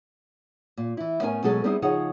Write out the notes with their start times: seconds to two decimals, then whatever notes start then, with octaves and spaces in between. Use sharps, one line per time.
0.78 A#2
0.97 E3 E4
1.21 A2 B3 C#4 A#4 F#5 G#5
1.43 B2 F#3 G#3 C#4 G#4 A4
1.64 G3 B3 C4 D#4 E4 G#4
1.82 C#3 F3 D#4 G#4 C#5 F#5